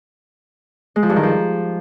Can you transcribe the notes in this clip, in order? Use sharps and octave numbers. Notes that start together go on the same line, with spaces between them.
G#3
F3
G2
D#3
F3